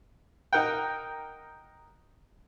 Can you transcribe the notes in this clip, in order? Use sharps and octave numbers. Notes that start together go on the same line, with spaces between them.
D#4 A#4 F#5 G5